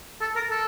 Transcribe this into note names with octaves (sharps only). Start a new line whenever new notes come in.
A4
A#4
A4